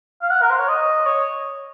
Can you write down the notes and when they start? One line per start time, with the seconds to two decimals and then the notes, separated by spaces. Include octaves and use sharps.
0.22 F5
0.30 F#5
0.42 A#4
0.50 C5
0.59 C#5
0.69 D#5
1.06 C#5